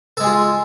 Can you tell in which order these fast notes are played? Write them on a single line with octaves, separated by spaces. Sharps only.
A4 G#3 G#4 F4